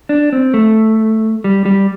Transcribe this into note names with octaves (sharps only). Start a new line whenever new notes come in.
D4
C4
A3
G3
G3